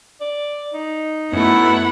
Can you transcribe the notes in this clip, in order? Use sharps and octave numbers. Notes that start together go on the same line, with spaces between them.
D5
D#4
F#2 A3 B3 E4 F#5